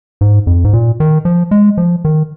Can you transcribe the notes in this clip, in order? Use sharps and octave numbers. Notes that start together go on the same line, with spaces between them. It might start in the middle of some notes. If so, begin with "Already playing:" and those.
G#2
F2
G#2
A#2
D#3
F3
G#3
F3
D#3